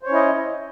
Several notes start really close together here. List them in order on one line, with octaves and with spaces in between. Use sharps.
C5 C#5 C#4 E4 D#5